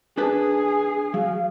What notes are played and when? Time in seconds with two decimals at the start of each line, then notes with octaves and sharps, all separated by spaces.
0.18 D4 G#4 B4 A5
1.14 F#3 F5